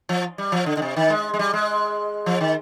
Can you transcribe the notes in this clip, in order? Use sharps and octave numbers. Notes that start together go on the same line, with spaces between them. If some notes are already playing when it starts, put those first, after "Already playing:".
F3
G3
F3
D3
D3
C3
D#3
G#3
G#3
G3
G#3
F3
D#3